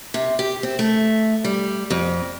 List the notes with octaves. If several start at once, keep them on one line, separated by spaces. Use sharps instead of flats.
C3
G4
C4
A3
G3
F2